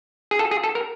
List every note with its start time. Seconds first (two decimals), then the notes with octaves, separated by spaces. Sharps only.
0.31 G#4
0.39 A4
0.51 G#4
0.64 A4
0.75 A#4